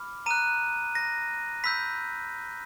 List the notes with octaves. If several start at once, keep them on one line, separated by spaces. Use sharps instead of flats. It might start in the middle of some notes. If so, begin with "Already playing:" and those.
Already playing: B5 D6 F6
A#5 D#6 F#6 D#7
A#6
B5 E6 G6 B6